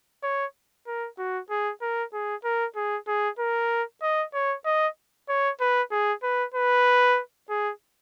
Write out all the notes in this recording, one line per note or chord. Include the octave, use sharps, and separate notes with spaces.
C#5
A#4
F#4
G#4
A#4
G#4
A#4
G#4
G#4
A#4
D#5
C#5
D#5
C#5
B4
G#4
B4
B4
G#4